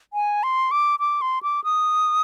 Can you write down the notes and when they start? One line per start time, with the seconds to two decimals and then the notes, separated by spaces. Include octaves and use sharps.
0.13 G#5
0.43 C6
0.71 D6
0.99 D6
1.21 C6
1.43 D6
1.64 D#6